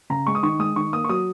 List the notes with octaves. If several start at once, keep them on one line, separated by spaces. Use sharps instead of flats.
C#3 A#5
G#3 C#6
D#6
D#3 C#6
G#3 D#6
D#3 C#6
A#3 D#6
C#6
F#3 D#6